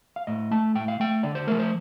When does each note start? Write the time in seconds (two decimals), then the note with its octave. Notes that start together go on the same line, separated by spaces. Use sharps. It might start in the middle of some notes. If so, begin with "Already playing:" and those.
0.16 F5
0.27 A2 D#5
0.51 A3 A5
0.75 A2 G5
0.88 F5
1.00 A3 G5
1.23 D3 D5
1.35 C5
1.47 F3 A3 A#4
1.59 C5